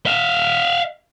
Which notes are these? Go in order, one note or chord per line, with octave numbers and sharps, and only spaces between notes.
E5 F5